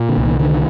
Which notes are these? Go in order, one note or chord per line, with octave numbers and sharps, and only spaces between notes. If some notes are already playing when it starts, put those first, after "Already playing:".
Already playing: A#2
D3
C2
D#3
D3 D#3